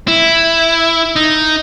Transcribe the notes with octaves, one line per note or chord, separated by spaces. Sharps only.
E4
D#4